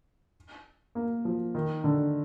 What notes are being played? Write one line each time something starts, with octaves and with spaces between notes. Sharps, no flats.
A#3
F3
D#3
D3